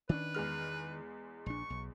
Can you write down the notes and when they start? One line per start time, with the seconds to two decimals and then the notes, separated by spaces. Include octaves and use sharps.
0.09 D#3 C#4 D4 B4
0.34 E2 G#3 F6
1.46 A#1 D4 C#6
1.70 B1